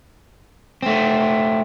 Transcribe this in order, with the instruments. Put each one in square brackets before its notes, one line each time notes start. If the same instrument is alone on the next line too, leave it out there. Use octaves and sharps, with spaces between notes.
[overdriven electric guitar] A3 C4